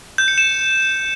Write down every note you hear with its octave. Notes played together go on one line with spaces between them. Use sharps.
G6
C#7
E7